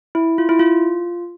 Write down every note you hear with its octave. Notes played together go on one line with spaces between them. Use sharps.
E4
F4
E4
F4